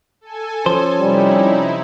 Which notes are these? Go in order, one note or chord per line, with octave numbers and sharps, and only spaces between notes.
A4 G#5
F3 C#4 C5
C3 G3 D#4 E4